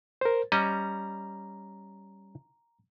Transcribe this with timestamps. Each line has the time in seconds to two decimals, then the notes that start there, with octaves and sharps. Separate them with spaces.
0.21 A#4 C5
0.52 G3 C#4 D#5 A#5